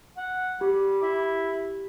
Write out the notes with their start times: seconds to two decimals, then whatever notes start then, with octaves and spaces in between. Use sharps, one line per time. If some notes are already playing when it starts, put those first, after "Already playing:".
0.17 F#5
0.61 G3 G4
1.03 E4